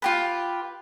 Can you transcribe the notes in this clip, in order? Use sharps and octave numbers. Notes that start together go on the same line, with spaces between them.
F4 G4 B4